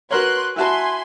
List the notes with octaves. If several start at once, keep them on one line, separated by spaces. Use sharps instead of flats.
F#4 A#4 B4 C#5 C6 F#6
E4 F#4 G#5 A5 B5 C6